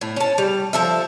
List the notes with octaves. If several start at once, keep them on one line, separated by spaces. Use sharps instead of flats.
A2
C#4 A5
G3
F3 A4 E5